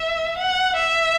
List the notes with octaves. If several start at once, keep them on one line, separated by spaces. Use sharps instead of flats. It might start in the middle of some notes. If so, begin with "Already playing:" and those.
Already playing: E5
F#5
E5